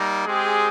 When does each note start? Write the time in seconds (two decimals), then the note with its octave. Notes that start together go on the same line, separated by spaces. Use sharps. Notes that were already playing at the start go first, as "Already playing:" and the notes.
Already playing: G3 A#3 D#4
0.26 G#3 C4 G4 G#4